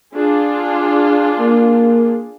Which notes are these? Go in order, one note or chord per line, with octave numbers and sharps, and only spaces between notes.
D4 F4 G#4
A#3